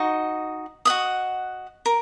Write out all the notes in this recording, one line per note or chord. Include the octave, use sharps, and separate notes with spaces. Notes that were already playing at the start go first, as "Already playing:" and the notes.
Already playing: D#4 F#4 D#5
F#4 D#5 F#5 D#6
A#4